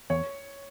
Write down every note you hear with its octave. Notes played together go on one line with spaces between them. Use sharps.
E2 C#5